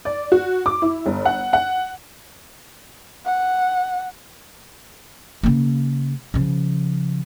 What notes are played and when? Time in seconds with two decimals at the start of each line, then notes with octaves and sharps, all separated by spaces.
0.05 D5
0.32 F#4
0.66 D6
0.82 E4
1.06 G1
1.25 F#5
1.53 F#5
3.26 F#5
5.43 C#3 A#3
6.34 C#3 F3